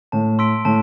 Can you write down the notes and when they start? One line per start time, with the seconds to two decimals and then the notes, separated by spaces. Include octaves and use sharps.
0.12 A2 A5
0.39 C6 E6 B6 D7
0.65 A2 A5